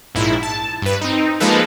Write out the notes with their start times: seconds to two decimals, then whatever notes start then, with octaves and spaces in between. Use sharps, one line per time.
0.15 A#1 G#2 E4
0.43 A5
0.82 G2 B4
1.01 C4 D#4
1.40 F3 G#3 A#3 D#4 A4 B4